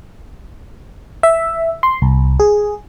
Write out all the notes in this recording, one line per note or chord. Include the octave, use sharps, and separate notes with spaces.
E5
C6
C2
G#4